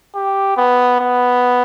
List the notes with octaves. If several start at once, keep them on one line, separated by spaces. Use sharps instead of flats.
G4
B3
B3